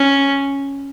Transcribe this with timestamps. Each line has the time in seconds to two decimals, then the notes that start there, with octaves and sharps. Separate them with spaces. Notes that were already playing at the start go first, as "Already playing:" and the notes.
Already playing: C#4